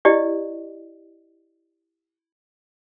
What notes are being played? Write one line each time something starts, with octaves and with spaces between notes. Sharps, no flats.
E4 G4 D5 D#5